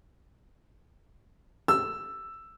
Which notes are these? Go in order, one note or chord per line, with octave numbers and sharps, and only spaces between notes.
E6